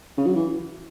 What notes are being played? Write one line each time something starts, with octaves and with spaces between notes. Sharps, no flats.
C#3
F#3
E3